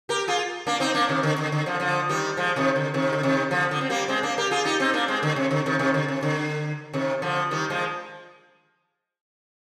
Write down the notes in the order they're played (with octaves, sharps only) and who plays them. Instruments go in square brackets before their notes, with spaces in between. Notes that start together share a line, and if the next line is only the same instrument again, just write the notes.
[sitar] G4 A#4
F4 G#4
A#3 D4
C4 D#4
A#3 D4
C3 D#3
D3
D3
D3
D3 F3
D3 F3
D#3 G3
F3 G#3
C3 D#3
D3
C3 D#3
D3
C3 D#3
D3 F3
D3
C4
G3 A#3
G#3 C4
A#3 D4
G4 A#4
F4 G#4
D#4 G4
C4 D#4
A#3 D4
G#3 C4
D3
C3
D3
C3 D#3
C3 D#3
D3
C3
D3
C3 D#3
D3 F3
D#3 G3
F3 G#3